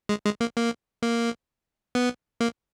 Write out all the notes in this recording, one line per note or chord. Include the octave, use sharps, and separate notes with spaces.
G#3
G#3
A#3
A#3
A#3
B3
A#3